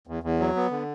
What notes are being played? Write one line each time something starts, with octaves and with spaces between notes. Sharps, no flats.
E2
E2
F#3
B3
D3